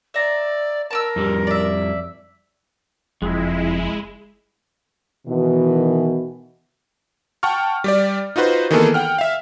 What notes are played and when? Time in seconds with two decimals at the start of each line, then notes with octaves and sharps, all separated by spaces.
0.14 D5 E5 A#5
0.91 A#4 A5 D6 E6
1.16 F2 G3
1.47 D5 E5
3.22 F#1 F2 G#3 E4
5.28 B2 D#3 E3
7.43 F#5 G5 A5 C#6 F6
7.84 G3 G4 D5
8.36 D#4 F4 F#4 B4 C5
8.71 D#3 E3 A#3 B3 G#4 A4
8.94 F#5 G5 F6
9.18 E5 F5